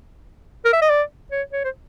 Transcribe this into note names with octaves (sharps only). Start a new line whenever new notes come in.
A#4
E5
D#5
D5
C#5
C#5
C5